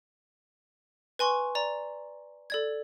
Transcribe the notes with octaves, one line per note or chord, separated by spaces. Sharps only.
B4 G#5 C6 C#6
D5 A#5
A4 D5 G#6